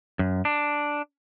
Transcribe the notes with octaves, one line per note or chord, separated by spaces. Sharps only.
F#2
D4